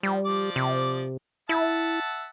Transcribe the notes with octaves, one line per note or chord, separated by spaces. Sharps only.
F3 G3
F3 D5 D6
C3
E4 E5 F#5 A5